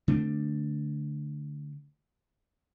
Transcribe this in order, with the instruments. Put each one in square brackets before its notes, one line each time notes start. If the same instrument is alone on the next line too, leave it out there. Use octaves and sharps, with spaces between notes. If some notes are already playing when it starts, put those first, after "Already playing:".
[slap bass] D3 A3 B3 C4